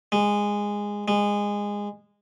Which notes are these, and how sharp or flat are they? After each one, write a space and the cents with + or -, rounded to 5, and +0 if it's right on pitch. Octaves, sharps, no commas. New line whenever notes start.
G#3 -15
G#3 -20